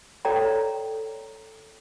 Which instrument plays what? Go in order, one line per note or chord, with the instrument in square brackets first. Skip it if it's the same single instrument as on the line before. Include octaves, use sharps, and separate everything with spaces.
[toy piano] A4 C#5 D5 G5 A#5